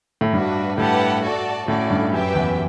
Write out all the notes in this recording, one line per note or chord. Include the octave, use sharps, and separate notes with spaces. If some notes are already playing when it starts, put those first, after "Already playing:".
A2
G2 D4 F#4 B4
A2 G4 B4 F#5 A5
F#4 A4 D5 A5
A2 C#4 F#4 A4 D5
G2
F#2 G4 B4 E5 G5
E2